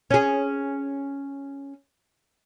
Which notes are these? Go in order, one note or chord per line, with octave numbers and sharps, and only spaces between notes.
C#4 G#4